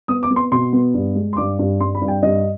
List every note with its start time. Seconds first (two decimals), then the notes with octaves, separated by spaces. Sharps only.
0.08 B3 D#6
0.23 D6
0.30 B3
0.36 C6
0.52 B2 C6
0.73 B3
0.94 G2
1.15 G#3
1.33 C6
1.37 G2 D6
1.59 G2
1.80 G2 C6
1.95 B5
2.02 G2
2.08 G5
2.22 G2 D#5